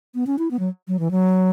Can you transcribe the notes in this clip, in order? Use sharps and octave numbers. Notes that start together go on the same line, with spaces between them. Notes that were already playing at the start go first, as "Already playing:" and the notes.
B3
C#4
E4
B3
F#3
F#3
E3
F#3